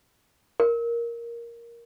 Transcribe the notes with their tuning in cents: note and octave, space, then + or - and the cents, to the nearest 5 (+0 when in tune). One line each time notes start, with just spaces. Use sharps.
A#4 +5